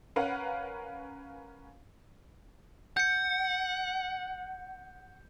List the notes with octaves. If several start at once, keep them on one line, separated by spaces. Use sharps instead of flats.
C#4 A#4 B4 F5 F#5
F#5 G6 C#7